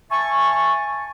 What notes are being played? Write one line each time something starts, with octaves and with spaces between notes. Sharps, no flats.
E5 G#5 A5 C#6